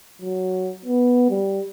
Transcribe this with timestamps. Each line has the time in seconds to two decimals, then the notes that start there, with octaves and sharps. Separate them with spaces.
0.22 F#3
0.86 B3
1.30 G3